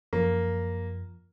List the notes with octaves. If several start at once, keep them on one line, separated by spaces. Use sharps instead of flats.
F#2 F3 A#3